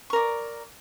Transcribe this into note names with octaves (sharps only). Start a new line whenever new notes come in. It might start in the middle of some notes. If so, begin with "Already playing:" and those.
A#4 D5 C#6